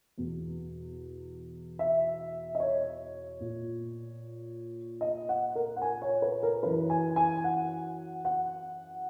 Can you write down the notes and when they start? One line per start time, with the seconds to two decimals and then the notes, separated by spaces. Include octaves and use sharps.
0.18 E2 B2
1.79 E5
2.55 D#5
2.60 C#5
3.40 A#2
5.01 D#5
5.29 F#5
5.55 A#4
5.76 F#5
5.82 G#5
6.02 C#5
6.22 B4
6.43 A#4
6.63 F#2 E3 B4
6.90 G#5
7.16 G#5
7.44 F#5
8.25 F#5